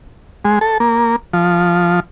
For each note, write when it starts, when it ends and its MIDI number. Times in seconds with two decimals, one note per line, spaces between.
0.45 0.59 56
0.61 0.78 69
0.80 1.16 58
1.33 2.00 53